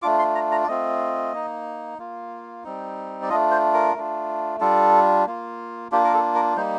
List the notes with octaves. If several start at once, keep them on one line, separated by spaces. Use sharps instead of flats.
A3 D4 F4 D6
C6
A#5
A#5
D5
A3 C4 F4 D#5
A#3 D#4
A#3 F4
G3 C4 D#4
D5
A3 D4 F4 D#5
C5
A#4
A3 D4 F4
G3 D4 F4 A4
A#3 F4
A#3 D4 F4 G4
A#4
A4
A#4
G3 A#3 D#4 C5